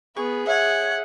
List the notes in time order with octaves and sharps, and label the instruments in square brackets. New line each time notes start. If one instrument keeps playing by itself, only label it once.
[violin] B3 [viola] G#4 [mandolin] C#6
[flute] C#5 [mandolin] E5 [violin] F#5